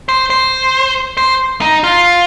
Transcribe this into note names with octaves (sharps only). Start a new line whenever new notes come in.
C5
C5
C5
D#4
F4